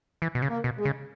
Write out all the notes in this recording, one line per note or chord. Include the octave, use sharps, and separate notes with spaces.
E3
B2
C#3
A#3
B2
G#3
C#3